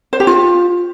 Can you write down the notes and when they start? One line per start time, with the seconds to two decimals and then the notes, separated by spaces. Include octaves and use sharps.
0.13 C5
0.20 G4
0.27 F4